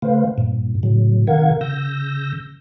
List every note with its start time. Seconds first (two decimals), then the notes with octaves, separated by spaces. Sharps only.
0.02 C#3 A3 B4 C5 F5
0.38 G2 A#2
0.83 A2 C#3 F#3
1.27 C3 D#3 A#4 F5 F#5 G#6
1.61 C#3 E6 G6 A#6